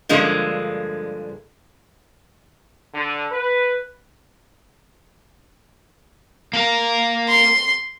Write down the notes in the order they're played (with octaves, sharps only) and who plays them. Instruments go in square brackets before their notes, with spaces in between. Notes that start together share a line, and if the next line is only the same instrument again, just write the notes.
[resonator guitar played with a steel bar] G2 D3 F3 G#3 A#3
[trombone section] D3
B4
[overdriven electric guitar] A#3 A#4
[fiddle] C6